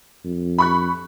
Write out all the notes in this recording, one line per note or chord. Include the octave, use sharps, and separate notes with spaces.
F2
B5 C#6 F#6